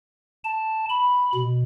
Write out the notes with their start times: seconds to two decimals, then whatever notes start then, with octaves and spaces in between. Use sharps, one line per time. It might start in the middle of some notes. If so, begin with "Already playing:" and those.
0.44 A5
0.90 B5
1.35 B2